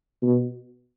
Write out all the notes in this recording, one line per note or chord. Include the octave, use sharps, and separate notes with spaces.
B2